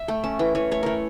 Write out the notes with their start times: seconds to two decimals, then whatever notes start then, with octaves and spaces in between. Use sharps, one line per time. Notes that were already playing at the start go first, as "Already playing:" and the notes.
Already playing: E5
0.08 A3 G5
0.24 C#4 A5
0.39 E3 G5
0.55 E3 C#5
0.71 A3 C#5
0.83 A3 A#4 C#5